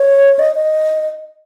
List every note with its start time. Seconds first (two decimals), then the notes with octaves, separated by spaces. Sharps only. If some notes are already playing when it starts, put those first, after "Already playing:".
Already playing: C#5
0.39 D#5
0.55 D#5